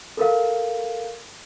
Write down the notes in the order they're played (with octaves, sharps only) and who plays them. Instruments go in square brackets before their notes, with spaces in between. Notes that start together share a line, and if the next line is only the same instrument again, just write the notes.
[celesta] A4 A#4 F5